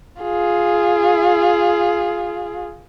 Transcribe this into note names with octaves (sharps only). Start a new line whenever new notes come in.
F4 G#4